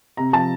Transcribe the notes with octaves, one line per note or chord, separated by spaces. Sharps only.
C3 A#5
F3 A5